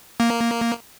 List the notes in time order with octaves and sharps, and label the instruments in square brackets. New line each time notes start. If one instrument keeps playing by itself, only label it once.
[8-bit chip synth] A#3